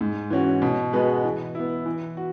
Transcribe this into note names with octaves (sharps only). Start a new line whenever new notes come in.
G#2
E3 C#4 F#4
B2
G#3 B3 F#4 B4
E3
B3 E4
E3
F#4